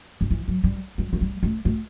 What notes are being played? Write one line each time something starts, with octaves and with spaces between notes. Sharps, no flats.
D3
E3
F#3
G3
G3
A3
G3
A3
A3